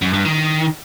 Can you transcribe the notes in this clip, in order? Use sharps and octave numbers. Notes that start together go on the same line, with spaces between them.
F#2
G2
D#3